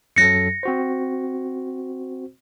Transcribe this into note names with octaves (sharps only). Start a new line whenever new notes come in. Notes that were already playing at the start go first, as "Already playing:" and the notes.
F#2 F#3 A4 A#6 C#7
C4 F#4 C5